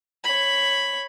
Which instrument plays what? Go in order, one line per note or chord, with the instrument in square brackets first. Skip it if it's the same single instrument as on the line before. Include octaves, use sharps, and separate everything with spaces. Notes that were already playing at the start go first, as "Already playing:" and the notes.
[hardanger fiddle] C#5 B5